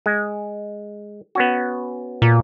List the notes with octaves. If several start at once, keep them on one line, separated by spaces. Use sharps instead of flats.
G#3
B3 C#4 F#4
A#2